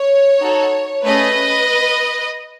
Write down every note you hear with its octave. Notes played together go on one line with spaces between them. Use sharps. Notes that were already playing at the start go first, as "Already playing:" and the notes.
Already playing: C#5
D#4 F#4 A4
A3 C#4 G#4 B4 D#5